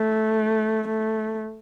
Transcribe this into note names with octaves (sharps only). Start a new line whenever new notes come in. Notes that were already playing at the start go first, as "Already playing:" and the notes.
Already playing: A3
A3